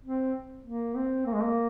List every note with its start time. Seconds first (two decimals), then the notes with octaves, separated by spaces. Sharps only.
0.05 C4
0.65 A#3
0.96 C4
1.26 A#3
1.33 G#3
1.42 A#3